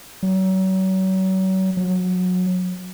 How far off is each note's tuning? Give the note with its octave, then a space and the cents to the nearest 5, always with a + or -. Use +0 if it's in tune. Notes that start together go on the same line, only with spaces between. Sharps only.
F#3 +35
F#3 -25